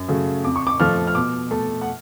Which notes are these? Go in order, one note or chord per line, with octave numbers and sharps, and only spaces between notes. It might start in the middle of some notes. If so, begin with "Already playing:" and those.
Already playing: F#2
C#3 F#3 A3
F2 D6
C#6
D6
F3 A3 F6
F6
B2 D6
A3 A5
F#5